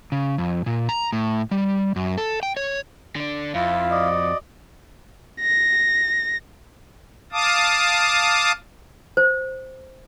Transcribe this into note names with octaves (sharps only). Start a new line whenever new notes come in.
C#3
F2
A#2
A#5
A2
G3
F#2
A4
G5
C#5
D3 D4
F2 E4 F4 F5
F#4 D5 D#5
A#6
F5 A5 D6 D#6
C5